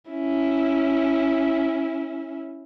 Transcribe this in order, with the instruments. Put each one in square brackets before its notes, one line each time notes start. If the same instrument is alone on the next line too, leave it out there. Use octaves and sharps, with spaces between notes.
[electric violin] C#4 E4